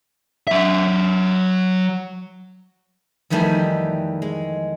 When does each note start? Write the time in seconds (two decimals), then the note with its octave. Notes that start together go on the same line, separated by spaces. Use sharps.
0.48 F#3 E5
3.30 F2 D#3 E3 G3 A3 G#5
4.22 G#3